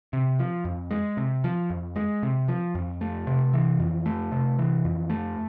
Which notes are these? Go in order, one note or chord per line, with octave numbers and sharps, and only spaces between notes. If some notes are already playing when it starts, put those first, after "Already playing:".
C3
F3
F2
G#3
C3
F3
F2
G#3
C3
F3
F2
A3
C3
E3
F2
A3
C3
E3
F2
A3